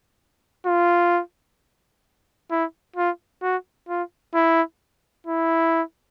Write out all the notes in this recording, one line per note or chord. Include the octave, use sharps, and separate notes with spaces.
F4
E4
F4
F#4
F4
E4
E4